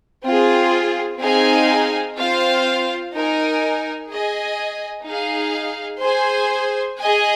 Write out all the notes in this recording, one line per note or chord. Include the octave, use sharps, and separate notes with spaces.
C4 F4 G#4
C4 D#4 G#4 F5 G#5
C4 F4 C5 F5
D#4 A#4 G#5
G#4 D#5 G#5
D#4 G#4 F5
G#4 C5 G#5
G#4 D#5 G#5